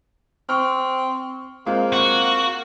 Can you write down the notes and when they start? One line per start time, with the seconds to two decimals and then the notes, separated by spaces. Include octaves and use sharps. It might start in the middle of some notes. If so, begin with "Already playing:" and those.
0.49 C4 C#6 F6
1.66 G#3 A#3 C4 F4
1.93 F#4